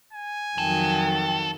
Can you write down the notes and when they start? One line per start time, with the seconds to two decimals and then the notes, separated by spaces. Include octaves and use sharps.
0.13 G#5
0.58 F2 D#3 F#3 A4 G5